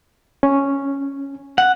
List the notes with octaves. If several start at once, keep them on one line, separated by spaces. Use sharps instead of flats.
C#4
F#5